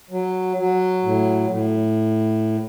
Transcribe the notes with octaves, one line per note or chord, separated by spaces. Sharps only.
F#3
F#3
A2
A2